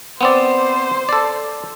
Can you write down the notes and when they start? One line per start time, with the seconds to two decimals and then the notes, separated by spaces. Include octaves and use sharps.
0.21 B3 C4 C5 D5
1.09 A4 D5